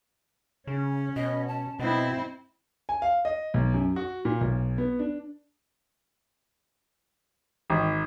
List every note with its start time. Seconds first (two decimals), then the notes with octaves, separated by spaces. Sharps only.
0.67 C#3 C#4
1.16 B2 D#5
1.48 A5
1.79 B2 C4 E4 D#5
2.89 G#5
3.02 F5
3.25 D#5
3.54 B1
3.74 F#2
3.96 F#4
4.25 A#2
4.41 B1
4.78 B3
4.99 D4
7.70 G#1